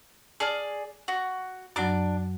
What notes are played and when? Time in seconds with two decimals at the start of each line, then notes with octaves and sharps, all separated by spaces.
0.40 G#4 D5 A5 F6
1.08 F#4
1.76 F#2 F#3 D4 D6